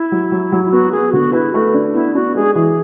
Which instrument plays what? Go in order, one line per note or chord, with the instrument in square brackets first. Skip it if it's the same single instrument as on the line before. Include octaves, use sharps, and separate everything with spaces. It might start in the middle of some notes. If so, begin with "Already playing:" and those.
Already playing: [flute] E4
[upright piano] F#3
F#3
F#3
[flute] E4
[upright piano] B3 [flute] F#4
[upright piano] B3 [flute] G#4
[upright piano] D3 [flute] F#4
[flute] E4 [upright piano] B4
[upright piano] A3 [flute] F#4
[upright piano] D4
[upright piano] B3 [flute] E4
[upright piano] D4 [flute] F#4
[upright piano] G#3 [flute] G#4
[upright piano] E3 [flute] G#4